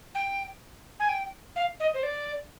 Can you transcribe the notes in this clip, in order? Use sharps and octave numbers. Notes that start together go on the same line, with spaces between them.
G5
G#5
G5
F5
D#5
C5
D5